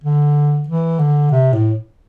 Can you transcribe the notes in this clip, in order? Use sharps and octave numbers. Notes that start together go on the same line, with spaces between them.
D3
E3
D3
C3
A2